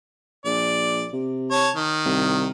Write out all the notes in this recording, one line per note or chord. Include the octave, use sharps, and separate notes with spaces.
A#1 D5
C3
C#5 A5
D#3
C2